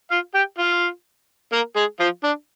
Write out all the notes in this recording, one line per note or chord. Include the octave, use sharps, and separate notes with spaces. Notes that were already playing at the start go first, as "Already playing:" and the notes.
F4 F5
G4 G5
F4 F5
A#3 A#4
G#3 G#4
F3 F4
D4